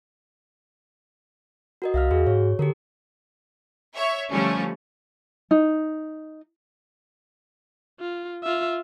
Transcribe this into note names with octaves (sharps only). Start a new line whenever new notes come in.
F#4 A#4 D#5
C2 E5 F5 F6
E2 F#4 G#4
G#2 C#5
D3 G4 A4 A#4
C#5 E5
D3 F3 G3 A3 C#4
D#4
F4
F4 E5